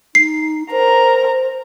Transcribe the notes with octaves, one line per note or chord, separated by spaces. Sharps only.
D#4 C7
A#4 C5 A#5